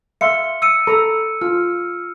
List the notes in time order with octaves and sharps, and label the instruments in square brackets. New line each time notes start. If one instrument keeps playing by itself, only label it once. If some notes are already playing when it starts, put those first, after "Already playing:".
[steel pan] E5 F5 C6 [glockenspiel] C#7
[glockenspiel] E6 C#7 D#7
[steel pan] A4 A#5 B5
[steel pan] F4 [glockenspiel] F6